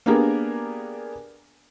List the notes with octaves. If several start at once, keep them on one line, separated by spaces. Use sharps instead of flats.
A#3 B3 D4 G4 G#4 A#4